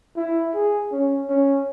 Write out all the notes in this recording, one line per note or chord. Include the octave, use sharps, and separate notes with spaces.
E4
G#4
C#4
C#4